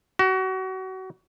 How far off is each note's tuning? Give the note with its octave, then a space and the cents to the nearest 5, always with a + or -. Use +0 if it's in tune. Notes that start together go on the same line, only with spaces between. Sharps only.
F#4 +30